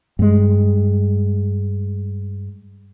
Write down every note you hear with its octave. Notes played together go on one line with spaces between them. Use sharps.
G2 G#3